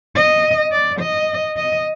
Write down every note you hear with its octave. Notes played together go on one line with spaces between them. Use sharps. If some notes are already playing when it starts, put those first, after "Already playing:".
D#5
D5
D#5
D#5